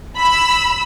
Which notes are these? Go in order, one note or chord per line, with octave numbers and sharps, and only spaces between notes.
B5 E6